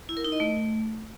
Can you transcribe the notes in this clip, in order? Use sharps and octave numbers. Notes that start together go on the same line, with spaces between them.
E4
A#4
D#4
D#5
A3